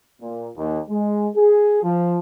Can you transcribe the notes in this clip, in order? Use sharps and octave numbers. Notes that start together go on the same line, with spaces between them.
A#2
D#2
G#3
G#4
F3